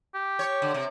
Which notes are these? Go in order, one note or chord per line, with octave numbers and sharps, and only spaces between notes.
G4
C#5
D3
C3